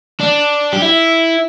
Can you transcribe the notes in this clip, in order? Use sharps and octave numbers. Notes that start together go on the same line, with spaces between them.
D4
G4
E4